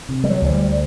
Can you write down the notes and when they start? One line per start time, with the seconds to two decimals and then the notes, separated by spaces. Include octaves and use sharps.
0.09 C3
0.24 G3
0.30 F#3
0.42 D2
0.47 F#3
0.52 G3